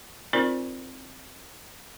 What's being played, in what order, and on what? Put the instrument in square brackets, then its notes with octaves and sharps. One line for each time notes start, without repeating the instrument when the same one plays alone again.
[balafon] C4 D#4 F4 A#4 C5 D5